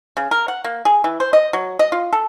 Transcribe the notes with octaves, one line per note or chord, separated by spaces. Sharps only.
C#3
A#4
F#5
A#3
G#4
E3
C5
D#5
F#3
D#5
F4
A4